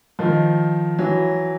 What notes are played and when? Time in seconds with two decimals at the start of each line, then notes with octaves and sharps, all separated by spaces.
0.19 D#3 F3
0.99 E3 F#3